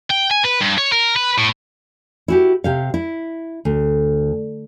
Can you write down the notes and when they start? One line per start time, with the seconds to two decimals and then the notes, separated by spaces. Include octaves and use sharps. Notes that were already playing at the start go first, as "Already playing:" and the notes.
0.10 G5
0.30 G#5
0.44 B4
0.61 G2
0.78 C#5
0.92 A#4
1.16 B4
1.38 A2
2.28 E4 F#4 G4
2.64 C3 G4 F5
2.94 E4
3.65 D2